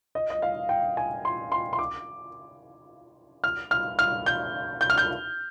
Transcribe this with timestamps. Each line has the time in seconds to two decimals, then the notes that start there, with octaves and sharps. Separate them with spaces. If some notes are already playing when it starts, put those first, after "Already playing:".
0.15 D#5
0.30 D#5
0.42 F5
0.69 G5
0.97 G#5
1.25 C6
1.52 C6
1.73 C6
1.79 D6
3.44 F6
3.71 F6
3.99 F6
4.26 G6
4.81 G6
4.90 F6
4.98 G6